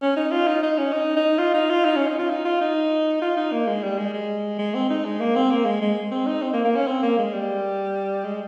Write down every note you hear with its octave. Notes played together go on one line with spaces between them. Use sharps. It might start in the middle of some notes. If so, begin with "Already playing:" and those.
C#4
D#4
F4
D#4
D#4
C#4
D#4
D#4
F4
D#4
F4
D#4
C#4
D#4
F4
D#4
F4
D#4
F4
D#4
A#3
G#3
G3
G#3
G#3
G#3
C4
D#4
G#3
A#3
C4
A#3
G#3
G#3
C4
D#4
C4
A#3
A#3
C#4
C4
A#3
G#3
G3
G#3